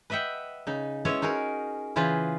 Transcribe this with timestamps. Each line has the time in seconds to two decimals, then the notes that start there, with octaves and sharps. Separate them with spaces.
0.10 B4 D#5 E5 F#5 G5
0.67 C#3 D#4
1.05 G#3 B3 C#4 E4 C#5
1.22 D#4 F#4 G#4 A#4
1.96 C#3 E3 F4 G#4 B4 C5